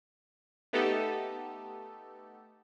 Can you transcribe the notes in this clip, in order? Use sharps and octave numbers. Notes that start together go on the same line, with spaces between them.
A3 B3 D#4 G4 A4